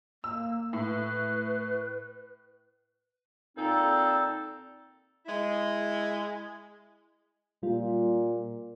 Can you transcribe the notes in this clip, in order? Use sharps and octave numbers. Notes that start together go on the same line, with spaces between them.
A#3 E6
A2 B4
A#2 C4 D#4 A4
G#3 E4
A#2 G3 F4